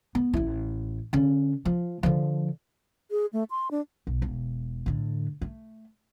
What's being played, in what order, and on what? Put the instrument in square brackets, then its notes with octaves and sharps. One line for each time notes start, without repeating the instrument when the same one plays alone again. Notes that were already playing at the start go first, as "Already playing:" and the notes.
[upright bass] B3
A1 E4
D3 C#4
F3
D3 F3
[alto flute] G#4
A3
C6
D4
[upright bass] B1
E1
A2 D3
A3